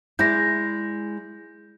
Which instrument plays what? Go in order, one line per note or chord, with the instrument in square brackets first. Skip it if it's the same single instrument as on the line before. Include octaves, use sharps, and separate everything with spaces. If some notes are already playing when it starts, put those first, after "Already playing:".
[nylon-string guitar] G#3 E4 D5 [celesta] G6 A#6